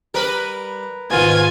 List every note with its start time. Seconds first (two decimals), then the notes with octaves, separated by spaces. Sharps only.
0.14 G3 A#4 B4
1.11 G#2 B2 D#3 F4 G#5